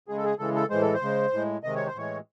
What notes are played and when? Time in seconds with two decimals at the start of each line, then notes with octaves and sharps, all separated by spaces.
0.08 C#3 G#3 G#4
0.17 A4
0.24 G#4
0.39 C#3 E3 G#3 A4
0.55 A4
0.70 A2 E3 G#3 C5
0.82 A4
0.94 C5
1.02 C#3 G#3
1.33 A2 G#3
1.63 C3 D#3 G#3 D#5
1.75 C#5
1.86 C5
1.95 A2 E3 G#3 C#5